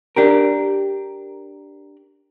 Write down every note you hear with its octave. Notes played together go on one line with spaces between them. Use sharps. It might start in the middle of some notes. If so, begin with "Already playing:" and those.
D4 G4 A#4